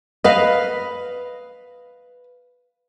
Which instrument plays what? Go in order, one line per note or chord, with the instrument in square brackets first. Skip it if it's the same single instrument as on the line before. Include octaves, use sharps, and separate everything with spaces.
[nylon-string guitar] B4 F5 [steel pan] D#5